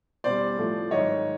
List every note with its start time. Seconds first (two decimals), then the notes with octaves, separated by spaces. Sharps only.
0.24 E2 B2 G3 C5 D5
0.57 A2 F3 A3
0.91 G#2 D#3 F#3 C#5 D#5